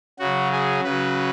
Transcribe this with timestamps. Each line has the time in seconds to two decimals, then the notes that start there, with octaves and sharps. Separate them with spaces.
0.19 C#3 F#3 F#4
0.52 G#4
0.84 C#3 F#3 B4